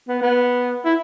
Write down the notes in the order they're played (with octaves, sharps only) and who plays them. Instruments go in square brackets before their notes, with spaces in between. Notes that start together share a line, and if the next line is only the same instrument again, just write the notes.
[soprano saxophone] B3
B3
E4